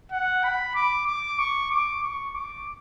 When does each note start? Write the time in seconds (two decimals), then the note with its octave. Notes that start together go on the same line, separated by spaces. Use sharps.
0.11 F#5
0.44 B5
0.75 D6
1.07 D6
1.39 C#6
1.71 D6
2.03 C#6
2.35 D6